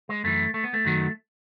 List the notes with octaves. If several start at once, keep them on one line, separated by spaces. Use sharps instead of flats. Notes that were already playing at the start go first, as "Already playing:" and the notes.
G#3
F#2 E3 A3
A3
B3
A3
F#2 D#3 F#3